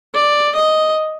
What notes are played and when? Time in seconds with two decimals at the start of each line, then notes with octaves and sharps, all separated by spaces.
0.14 D5
0.55 D#5